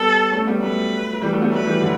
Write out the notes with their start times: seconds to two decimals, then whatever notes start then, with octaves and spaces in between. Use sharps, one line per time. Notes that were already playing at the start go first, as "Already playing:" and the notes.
Already playing: G3 B3 A4
0.32 A3 C#4
0.47 G3 B3
0.62 F#3 A3 B4
1.13 F#3
1.22 E3 G3
1.32 F#3 A3
1.42 G3 B3
1.52 F#3 A3 B4
1.67 E3 G3
1.82 D3 F#3